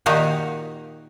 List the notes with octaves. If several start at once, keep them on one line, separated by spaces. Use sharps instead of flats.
A#2 D#3 D#4 F#4 G4 A#5